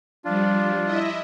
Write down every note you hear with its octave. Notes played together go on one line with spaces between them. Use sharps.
F3 G3 D4 F4
E4 D#5 E5